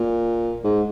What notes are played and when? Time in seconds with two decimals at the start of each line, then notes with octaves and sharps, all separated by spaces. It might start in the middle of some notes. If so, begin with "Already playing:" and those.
Already playing: A#2
0.64 G#2